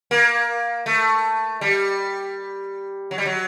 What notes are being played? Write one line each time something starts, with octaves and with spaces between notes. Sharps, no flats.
A#3
A3
G3
F#3
G3
F#3